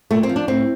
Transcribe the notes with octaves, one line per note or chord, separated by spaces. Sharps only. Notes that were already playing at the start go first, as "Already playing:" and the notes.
A#2 A3
C4
F3
D4
A2 C4